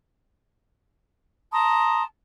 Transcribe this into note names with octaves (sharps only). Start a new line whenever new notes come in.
A5 A#5 C6 D#6